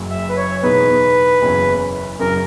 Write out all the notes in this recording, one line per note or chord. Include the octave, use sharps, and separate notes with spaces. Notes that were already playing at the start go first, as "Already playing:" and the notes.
Already playing: F#1 F#2 C#3 F#3
E5
B4
C#5
E2 B2 G#3 B3 D#4 B4
F#1 E2 C#3 F#3 C#4
F#2 C#3 F#3 A#4